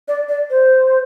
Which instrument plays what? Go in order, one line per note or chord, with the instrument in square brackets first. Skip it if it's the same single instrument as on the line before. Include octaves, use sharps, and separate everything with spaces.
[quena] D5
D5
C5